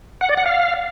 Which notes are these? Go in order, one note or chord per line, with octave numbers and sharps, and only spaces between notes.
F#5
D5
F#5
F5